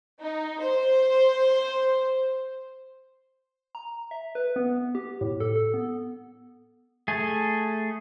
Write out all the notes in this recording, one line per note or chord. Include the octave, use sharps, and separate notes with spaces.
D#4
C5
A#5
E5
B4
B3
G4
A2
A4
A4
B3
A3 G#4